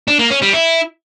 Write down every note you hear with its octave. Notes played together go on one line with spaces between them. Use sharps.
D4
A#3
C#4
G3
E4